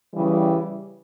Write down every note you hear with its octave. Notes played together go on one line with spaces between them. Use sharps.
C#3 E3 G3